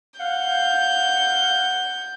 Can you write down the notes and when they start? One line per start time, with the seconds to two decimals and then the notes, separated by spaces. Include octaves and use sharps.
0.20 F5 F#5 G6